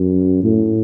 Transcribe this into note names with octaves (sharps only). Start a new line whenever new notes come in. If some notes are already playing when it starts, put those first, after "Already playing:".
Already playing: F#2
A2